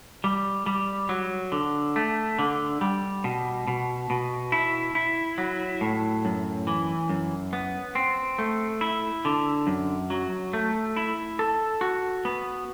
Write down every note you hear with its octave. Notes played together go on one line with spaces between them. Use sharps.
G3
G3
F#3
D3
A3
D3
G3
B2
B2
B2
E4
E4
F#3
A2
F#2
E3
F#2
B3
C4
A3
E4
D3
F#2
F#3
A3
E4
A4
F#4
B3